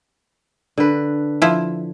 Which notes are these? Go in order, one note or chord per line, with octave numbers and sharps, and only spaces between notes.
D3 B4
F3 E4